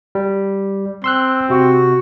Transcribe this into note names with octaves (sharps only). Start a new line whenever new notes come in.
G3
C4 C6 E6 F#6
C3 F#4